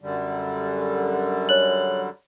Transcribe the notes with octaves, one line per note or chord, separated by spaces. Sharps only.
F#2 D3 G3
C#5 F#6 F#7